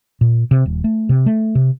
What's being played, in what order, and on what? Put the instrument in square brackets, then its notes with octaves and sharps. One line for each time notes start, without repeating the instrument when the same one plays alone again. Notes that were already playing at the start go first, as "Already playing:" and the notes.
[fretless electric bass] A#2
C3
D#1
A3
C3
A3
C3